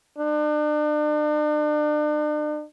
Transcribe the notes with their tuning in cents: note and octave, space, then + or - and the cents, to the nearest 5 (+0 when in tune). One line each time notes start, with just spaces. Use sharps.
D4 +40